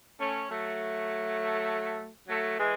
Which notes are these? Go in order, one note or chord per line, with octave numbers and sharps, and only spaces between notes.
A3 C#4
F#3 A3
F#3 A3
E3 G#3